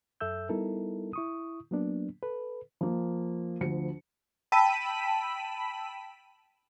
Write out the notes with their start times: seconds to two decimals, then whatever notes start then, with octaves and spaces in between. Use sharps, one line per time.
0.20 F#2 A4 E5 E6 G6
0.49 G3 B3 D#4 E4 A4 A#4
1.13 E4 C#6 D#6
1.71 F#3 A#3 B3 D4
2.22 A4 B4
2.81 F3 A#3
3.61 D2 F3 C#7
4.52 G5 A5 B5 E6 B6 D#7